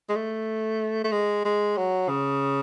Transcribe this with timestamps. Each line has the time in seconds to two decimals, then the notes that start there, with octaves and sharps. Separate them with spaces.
0.09 G#3
0.16 A3
1.04 A3
1.12 G#3
1.45 G#3
1.77 F#3
2.09 C#3